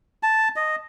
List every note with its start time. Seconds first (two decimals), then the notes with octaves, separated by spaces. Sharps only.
0.23 A5
0.56 D#5